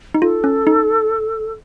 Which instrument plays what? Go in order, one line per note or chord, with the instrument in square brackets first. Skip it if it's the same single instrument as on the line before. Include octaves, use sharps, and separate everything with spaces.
[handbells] D#4
[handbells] F4 [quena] A4
[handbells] C#4
D#4